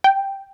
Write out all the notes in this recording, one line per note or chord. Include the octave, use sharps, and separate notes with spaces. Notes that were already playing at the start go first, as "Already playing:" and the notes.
G5